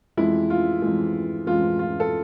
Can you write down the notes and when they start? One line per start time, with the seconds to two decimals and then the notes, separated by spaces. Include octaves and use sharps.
0.17 F2 E3 G#3 E4
0.50 F4
0.82 F2 E3 G#3
1.47 F2 E3 G#3 F4
1.79 F4
2.00 A4